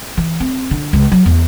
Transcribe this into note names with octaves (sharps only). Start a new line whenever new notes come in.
E3
C4
D3
C#2
F#3
E2